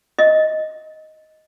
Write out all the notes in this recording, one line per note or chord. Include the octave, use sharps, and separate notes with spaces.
D#5 E5